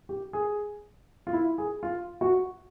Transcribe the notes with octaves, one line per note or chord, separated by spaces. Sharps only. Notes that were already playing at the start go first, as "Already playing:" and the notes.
G4
G#4
F4
E4
G#4
F4
F#4